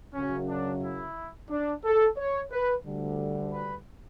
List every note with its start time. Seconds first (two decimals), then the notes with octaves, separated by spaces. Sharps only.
0.14 F#2 C#3 F#3 C#4
0.48 D4
0.83 E4
1.49 D4
1.84 A4
2.17 C#5
2.51 B4
2.84 D2 D3 G3
3.52 B4